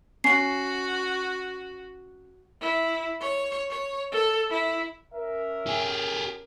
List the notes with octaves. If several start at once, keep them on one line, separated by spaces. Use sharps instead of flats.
C#4 F#4 C7
E4
C#5
C#5
A4
E4
C#4 A#4 E5
G4 G#4